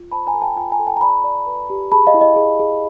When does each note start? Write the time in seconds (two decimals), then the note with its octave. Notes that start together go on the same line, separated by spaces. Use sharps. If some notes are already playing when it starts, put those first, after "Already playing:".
Already playing: F4
0.12 C5 A5 B5
0.27 G#5 A#5
0.34 A4
0.42 G5 A5
0.56 F4 G5 A5
0.72 G#5 A#5
0.79 A4
0.87 G5 A5
0.97 A#5
1.01 D5 A5 B5
1.24 D5
1.47 B4
1.70 G4
1.92 G#4 A5 B5
2.07 D#5 F5
2.14 E4
2.21 D#5
2.36 G#4
2.60 G#4